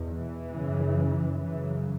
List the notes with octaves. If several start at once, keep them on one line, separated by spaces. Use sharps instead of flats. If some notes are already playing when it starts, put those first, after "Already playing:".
Already playing: E2 B2
E3
F#2 C#3
F#2 C#3 E3